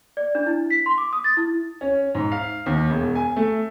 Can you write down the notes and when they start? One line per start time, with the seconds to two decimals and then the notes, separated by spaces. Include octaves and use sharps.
0.17 D5
0.35 D4
0.46 E4
0.70 B6
0.86 C6
0.98 D6
1.13 D#6
1.24 A6
1.37 E4
1.81 C#4
2.15 G#2
2.32 F5
2.66 D#2
2.90 E1
3.15 G#5
3.36 A3